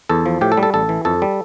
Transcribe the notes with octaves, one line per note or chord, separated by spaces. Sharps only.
E2 A4
F3
A2 G4
A4
G3
A4
A1 A4
E3
F2 A4
G3